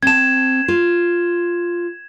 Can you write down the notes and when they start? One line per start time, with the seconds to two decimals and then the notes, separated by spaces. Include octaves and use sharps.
0.03 C4 A5 G#6 E7
0.68 F4